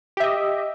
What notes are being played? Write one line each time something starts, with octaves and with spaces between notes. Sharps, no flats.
G4 D#5 E5